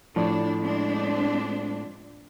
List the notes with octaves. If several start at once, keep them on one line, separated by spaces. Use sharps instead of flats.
A2 F3 D4 D5
G#3 C4 D4